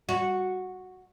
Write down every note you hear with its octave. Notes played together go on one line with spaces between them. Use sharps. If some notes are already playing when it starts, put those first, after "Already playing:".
F#4